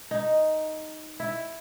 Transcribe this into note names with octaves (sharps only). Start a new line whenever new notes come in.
D#4
E4